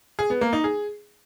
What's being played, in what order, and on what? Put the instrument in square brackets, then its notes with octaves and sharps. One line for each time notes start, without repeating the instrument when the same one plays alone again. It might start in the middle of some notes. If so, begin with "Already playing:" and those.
[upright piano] G#4
B3
A#3
D#4
G#4